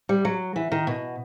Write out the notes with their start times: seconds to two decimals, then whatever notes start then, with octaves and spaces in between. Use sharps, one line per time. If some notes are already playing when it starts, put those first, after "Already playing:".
0.09 G3
0.25 F#3
0.56 E3
0.72 D#3
0.87 B2